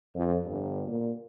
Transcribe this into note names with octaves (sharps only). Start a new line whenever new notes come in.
F2
G1
A#2